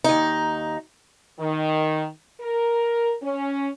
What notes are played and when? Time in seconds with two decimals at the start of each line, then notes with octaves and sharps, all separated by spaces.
0.04 D#2 D#4
1.40 D#3
2.41 A#4
3.23 C#4